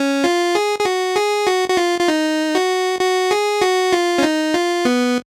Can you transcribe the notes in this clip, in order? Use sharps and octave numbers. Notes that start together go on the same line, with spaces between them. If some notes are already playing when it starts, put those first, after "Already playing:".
Already playing: C#4
F4
G#4
G#4
F#4
G#4
F#4
F#4
F4
F4
D#4
F#4
F#4
G#4
F#4
F4
C#4
D#4
F4
B3